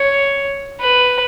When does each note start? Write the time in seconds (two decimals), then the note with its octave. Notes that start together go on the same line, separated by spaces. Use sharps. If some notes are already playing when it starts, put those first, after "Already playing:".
Already playing: C#5
0.81 B4